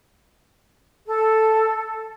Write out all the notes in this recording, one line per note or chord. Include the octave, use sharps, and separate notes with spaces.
A4